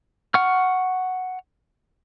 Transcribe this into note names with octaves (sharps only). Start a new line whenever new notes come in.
F#5 C#6 F6